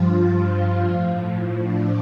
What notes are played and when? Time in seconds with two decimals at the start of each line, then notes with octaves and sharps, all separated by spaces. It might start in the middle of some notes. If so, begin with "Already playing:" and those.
Already playing: G2 F3 F4
0.85 A2 F3
1.56 D4